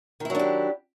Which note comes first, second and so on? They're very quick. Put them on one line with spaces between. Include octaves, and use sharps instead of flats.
D#3 E4 F#3 D4 G4